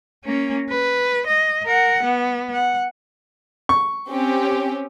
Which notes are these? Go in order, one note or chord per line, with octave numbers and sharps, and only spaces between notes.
A#3 C#4
B4
D#5
A#4 F#5
B3
F#5
C#6
C4 C#4 G4